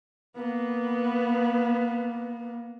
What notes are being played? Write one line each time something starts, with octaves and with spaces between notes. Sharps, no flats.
A#3 B3